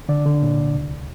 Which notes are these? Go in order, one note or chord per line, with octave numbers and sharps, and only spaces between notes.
D3 D5
D3
A#2
C2
D2